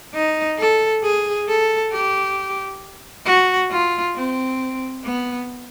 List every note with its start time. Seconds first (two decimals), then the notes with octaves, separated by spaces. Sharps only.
0.14 D#4
0.58 A4
1.03 G#4
1.48 A4
1.92 G4
3.25 F#4
3.70 F4
4.15 C4
5.04 B3